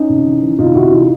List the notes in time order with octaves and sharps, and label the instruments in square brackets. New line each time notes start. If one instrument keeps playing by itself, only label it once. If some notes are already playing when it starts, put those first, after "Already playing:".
Already playing: [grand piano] C#4 D#4
C3
E3
E3
C3 D#4 F4
C3 E4 F#4
E3 D#4 F4